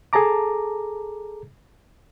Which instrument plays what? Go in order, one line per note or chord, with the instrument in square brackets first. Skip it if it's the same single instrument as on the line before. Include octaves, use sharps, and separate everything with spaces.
[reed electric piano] G#4 A4 A5 A#5 D6